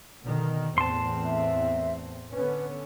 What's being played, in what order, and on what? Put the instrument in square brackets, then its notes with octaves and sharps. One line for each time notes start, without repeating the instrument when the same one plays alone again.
[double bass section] B2 D3 D#3
[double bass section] E2 A2 C4 [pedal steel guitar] A5 C6
[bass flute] E5
[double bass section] D3 B3 C#4 [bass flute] B4